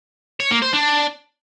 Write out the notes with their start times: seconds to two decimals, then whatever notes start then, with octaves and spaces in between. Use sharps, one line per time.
0.40 C#5
0.51 A#3
0.62 C5
0.73 D4